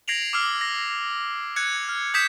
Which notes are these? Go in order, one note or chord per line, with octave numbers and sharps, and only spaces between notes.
G#6 A#6 C7 D7 F7 F#7
D6 E6 F6 C7
A#6
F#6 G#6 C#7
F6
D#6 G6 G#6 B6 C#7 E7